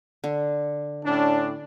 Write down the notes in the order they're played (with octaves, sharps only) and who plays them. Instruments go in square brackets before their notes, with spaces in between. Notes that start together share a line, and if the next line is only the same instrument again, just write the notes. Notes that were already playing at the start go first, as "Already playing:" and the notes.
[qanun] D3
[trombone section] A2 C#4 D4